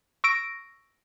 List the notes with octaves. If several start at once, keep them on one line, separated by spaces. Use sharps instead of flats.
C#6 E6 A#6 D7